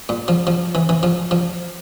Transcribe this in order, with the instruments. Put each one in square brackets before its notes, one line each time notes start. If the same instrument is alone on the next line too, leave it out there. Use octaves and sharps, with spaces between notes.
[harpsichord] A#2
F3
F3
E3
E3
F3
F3